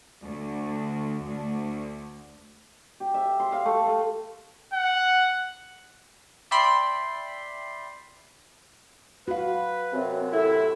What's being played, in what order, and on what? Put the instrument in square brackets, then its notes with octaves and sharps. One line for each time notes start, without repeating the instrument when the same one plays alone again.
[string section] D2
D2
[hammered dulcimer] G4
E5
C6
F5
A3
A3
[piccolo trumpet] F#5
[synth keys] D5 E5 G5 B5 C6
[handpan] F#4 F5 [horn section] B4
[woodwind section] F#2 C3 [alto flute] C4
[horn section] A2 E4 [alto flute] A4